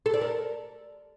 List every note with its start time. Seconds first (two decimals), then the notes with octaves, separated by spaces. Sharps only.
0.06 A4
0.13 D5
0.21 A#4